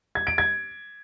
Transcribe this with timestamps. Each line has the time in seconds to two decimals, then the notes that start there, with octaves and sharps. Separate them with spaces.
0.15 G#6
0.27 D7
0.38 G#6